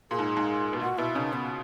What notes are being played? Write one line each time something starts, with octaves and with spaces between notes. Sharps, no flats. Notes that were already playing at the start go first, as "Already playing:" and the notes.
A#2 G#4
G#2
G#2
B2
A#2 F#4
B2 E4
C#3 D#4
B3